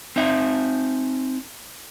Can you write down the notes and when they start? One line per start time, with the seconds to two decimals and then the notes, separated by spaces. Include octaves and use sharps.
0.16 C4 D#4 E5